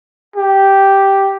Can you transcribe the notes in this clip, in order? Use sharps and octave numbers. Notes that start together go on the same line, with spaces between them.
G4